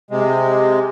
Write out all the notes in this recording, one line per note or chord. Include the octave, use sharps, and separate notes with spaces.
C3 G#3